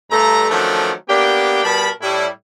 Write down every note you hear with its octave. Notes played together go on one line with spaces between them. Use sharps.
G2 A3 A#5
D#3 F3 F#3 A3 C#4 D4
A#3 B3 D4 G4
B2 G3 A#4 A5 B5
A2 G3 E4